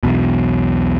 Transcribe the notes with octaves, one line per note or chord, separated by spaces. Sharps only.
B1 E2 B2